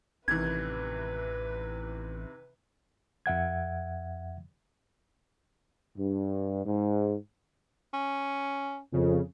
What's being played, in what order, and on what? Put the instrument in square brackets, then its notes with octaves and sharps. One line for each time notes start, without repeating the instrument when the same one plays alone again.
[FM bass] A1 [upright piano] C3 D#3 E3 [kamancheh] B4 [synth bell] G#6
[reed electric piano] F2 E5 F#5 G#6
[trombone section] G2
G#2
[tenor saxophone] C#4
[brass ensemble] F2 [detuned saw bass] C#3